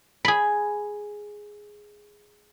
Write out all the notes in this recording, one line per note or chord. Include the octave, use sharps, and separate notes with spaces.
G#4 B5